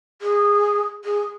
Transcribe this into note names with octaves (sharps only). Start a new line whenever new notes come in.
G#4
G#4